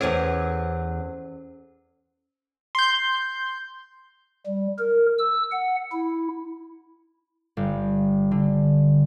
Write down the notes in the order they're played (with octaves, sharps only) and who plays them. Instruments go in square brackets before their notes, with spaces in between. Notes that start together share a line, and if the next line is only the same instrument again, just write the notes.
[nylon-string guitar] E2 C#5 [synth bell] C#4 A4 C5
[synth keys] C6 G6
[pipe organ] G3
A#4
E6
F#5
E4
[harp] G1
D3